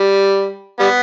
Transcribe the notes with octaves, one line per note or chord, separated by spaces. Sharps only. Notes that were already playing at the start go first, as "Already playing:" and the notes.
Already playing: G3
G3 B3